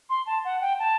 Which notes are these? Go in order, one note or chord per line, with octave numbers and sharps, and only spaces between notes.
C6
A5
F#5
G5
A5